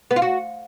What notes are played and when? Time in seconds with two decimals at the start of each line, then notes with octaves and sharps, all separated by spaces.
0.11 B3
0.16 F4
0.22 F#4